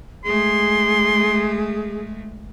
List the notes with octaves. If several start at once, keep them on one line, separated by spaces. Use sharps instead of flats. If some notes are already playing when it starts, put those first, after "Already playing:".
G#3 A3 G#4 C6